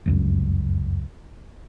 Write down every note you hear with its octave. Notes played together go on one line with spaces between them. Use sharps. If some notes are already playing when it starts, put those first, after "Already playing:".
F1 C#2 F#2